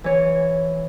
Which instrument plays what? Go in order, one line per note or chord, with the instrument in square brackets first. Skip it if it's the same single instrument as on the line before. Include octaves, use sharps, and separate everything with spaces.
[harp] E3 C#5